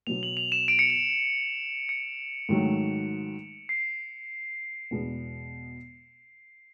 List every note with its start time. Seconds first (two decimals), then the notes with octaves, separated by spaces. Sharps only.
0.07 B2 F#3 B3 F7
0.23 F#7
0.37 F7
0.52 E7
0.68 D7
0.79 C#7
0.90 D7
1.89 C#7
2.49 G#2 D#3 F#3 A3
3.69 C7
4.91 E2 B2 G#3 B3